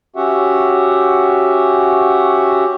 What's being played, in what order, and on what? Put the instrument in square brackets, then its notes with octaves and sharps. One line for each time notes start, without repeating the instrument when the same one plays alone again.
[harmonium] C#4 F#4 G4 E5 F#5